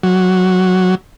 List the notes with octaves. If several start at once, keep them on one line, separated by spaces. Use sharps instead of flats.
F#3